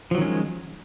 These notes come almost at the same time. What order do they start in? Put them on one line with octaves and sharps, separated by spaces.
F3 F#3 D#3 C#4 G#3